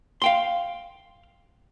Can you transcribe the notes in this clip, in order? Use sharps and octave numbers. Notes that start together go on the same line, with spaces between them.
F5 G5 C6